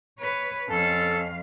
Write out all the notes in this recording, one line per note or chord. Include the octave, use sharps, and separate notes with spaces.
B4 C#5
F2 C#4 A4 F5